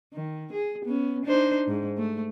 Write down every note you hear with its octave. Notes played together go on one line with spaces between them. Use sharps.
D#3
G#4
B3 C#4
D4 D#4 C5
G#2
A3